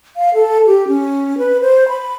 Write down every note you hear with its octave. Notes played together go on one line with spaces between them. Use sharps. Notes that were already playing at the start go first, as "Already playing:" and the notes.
F5
A4
G4
C#4
B4
C5
B5